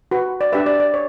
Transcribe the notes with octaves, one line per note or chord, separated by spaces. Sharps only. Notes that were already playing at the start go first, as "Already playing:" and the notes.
F#4 B4
D5
D4 G4 B4 E5
D5
D5
C#5